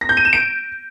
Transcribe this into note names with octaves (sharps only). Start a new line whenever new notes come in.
A#6
G6
D#7
E7
D7